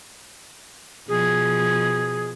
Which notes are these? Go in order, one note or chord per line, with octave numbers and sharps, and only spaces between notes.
B2 F3 G#4